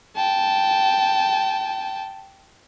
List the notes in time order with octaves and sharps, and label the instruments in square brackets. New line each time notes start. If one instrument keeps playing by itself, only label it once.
[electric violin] G5 A5